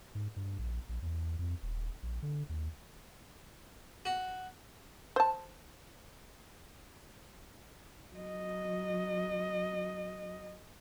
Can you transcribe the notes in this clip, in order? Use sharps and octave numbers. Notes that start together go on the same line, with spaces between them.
G#2
G2
A#1
A#1
E2
F2
D#1
A#1
D3
D#2
F#4
C5 A5
F#3 D#5